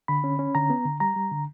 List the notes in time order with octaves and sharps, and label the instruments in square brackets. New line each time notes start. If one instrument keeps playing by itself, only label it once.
[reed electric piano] D3 B5
C#4
C#4
D3 A#5
B3
D3
G3 A#5
G3
D3